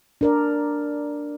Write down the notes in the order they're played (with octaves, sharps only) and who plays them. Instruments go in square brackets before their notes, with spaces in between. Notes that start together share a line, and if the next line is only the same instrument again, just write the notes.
[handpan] D4 A#4 D5